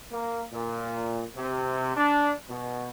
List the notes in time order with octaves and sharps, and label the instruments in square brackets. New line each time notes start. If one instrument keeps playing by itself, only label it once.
[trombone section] A#3
A#2
C3
D4
B2